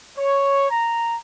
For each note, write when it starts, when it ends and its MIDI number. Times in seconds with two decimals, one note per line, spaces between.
0.18 0.66 73
0.70 1.16 82